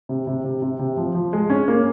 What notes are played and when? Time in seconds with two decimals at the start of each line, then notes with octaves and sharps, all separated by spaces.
0.09 C3
0.27 C3
0.44 C3
0.62 C3
0.79 C3
0.97 F3
1.15 F3
1.33 G#3
1.50 C#4
1.68 A#3